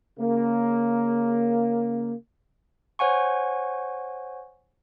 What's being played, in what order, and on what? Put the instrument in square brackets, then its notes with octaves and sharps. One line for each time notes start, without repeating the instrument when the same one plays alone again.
[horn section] C#3 A#3
[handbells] C5 C#5 F#5 G#5 C#6